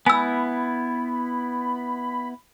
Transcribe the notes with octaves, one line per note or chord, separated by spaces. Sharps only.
B3 E4 G#5 B5 E6